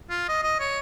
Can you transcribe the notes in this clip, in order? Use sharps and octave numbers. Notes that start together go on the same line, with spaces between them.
F4
D#5
D#5
C#5